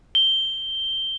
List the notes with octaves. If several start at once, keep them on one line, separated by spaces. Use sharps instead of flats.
G7